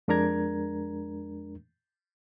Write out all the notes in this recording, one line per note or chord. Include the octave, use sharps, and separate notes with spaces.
F2 G#3 D4 A#4 A#5 G#6